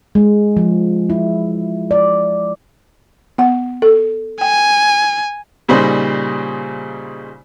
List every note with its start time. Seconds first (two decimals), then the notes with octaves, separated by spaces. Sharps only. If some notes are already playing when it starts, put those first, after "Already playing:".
0.15 G#3
0.57 F3
1.10 E4
1.91 D5
3.38 B3 F#5
3.82 A4
4.41 G5 G#5
5.69 A#2 C#3 G3 D#4 C5 B5